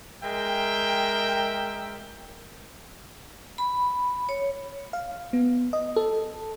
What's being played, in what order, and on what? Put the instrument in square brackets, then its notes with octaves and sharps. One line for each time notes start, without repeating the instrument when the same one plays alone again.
[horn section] G#3 A#4 E5 G5
[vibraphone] B5
C#5
[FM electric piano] F5
B3
D#5
A4